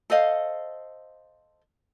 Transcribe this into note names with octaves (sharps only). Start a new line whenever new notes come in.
A4 C5 D#5 F5